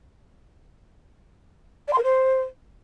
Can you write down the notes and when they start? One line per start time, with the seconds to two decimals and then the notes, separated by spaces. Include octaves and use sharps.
1.88 D5
1.93 C6
1.98 A#4
2.03 C5